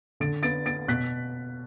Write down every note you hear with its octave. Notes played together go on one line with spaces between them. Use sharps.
D3 A6 D7
B3 A6 D7
B3 A6 D7
B2 F#6 B6